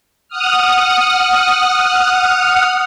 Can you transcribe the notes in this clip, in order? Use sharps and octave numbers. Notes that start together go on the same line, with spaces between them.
F#5 D#6 F6